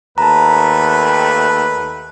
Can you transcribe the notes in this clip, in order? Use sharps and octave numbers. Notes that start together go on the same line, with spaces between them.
D#2 A3 B4 A5 A#5